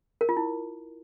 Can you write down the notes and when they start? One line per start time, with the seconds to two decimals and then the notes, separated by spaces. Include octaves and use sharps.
0.21 A#4
0.29 F4
0.37 E4